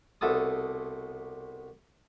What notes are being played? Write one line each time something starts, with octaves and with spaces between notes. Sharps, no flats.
C2 B2 A4 A5 D#6